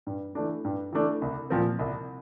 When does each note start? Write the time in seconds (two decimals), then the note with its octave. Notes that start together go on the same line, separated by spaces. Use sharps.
0.07 G2
0.35 E3 A3 D4
0.65 G2
0.93 E3 A3 D4
1.22 C2
1.50 A#2 F3 C4
1.79 C2